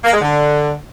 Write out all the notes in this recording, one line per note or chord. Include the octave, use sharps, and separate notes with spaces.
A#3
G#3
D3